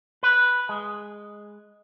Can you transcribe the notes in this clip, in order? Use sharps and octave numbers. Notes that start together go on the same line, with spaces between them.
B4
G#3